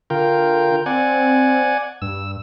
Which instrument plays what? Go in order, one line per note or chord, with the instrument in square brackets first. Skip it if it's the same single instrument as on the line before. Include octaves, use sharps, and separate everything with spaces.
[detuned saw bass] D3 [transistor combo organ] F4 A#4 G5
[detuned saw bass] C4 [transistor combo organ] D5 F#5 G#5
[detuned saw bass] G2 [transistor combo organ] E6